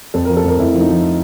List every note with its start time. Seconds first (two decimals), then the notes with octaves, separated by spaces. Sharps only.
0.14 F2 A4
0.25 A#4
0.30 F3
0.37 A4
0.44 F2 A#4
0.58 F2 E4
0.74 F3
0.81 D#4
0.89 F3